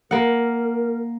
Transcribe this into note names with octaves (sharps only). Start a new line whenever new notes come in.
A#3 A#4 F#5